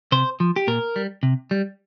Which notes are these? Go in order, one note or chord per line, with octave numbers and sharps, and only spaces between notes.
C3 C5
F3
G4
A#2 A#4
G3
C3
G3